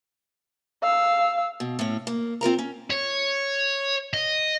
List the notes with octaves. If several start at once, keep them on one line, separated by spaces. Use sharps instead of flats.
F5 E6
B2
A2 C#4
A#3
C4 F4 A#4 A#5
C#4
C#5
D#5